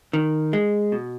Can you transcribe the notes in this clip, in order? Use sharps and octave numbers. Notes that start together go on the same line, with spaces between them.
D#3
G#3
B2